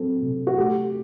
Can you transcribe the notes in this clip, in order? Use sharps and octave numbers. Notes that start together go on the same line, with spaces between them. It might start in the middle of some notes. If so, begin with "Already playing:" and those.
Already playing: F#3 C4 A4
C3
F#4
A3 G4